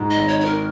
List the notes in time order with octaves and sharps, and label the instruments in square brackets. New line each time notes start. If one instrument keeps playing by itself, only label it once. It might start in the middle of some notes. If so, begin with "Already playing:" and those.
Already playing: [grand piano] G#2
[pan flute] D#5
[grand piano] G#1
[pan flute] C#5
[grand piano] D#3 [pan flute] C#5
[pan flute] A#4